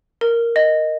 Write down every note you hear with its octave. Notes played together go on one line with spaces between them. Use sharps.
A#4
D#5